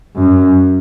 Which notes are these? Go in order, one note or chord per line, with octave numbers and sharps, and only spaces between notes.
F#2